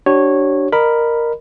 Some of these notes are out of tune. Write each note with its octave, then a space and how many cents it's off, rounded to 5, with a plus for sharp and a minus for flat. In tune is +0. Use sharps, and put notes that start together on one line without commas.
D4 +0 G4 -45 C#5 -15
A#4 +0 D#5 -35 B5 +0